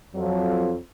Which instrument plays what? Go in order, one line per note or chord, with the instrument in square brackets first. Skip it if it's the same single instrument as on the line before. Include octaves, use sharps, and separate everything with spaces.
[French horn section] F2 F3 F#3